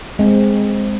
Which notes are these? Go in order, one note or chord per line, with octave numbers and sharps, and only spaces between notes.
G#3 C4